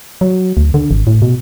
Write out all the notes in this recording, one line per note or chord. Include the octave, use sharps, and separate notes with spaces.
F#3
D2
D3
G#1
A2
B2